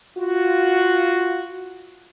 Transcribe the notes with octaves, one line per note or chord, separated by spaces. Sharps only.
F4 F#4